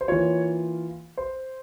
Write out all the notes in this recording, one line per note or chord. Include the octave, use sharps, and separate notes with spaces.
C5
E3 A#3 F4 C#5
C5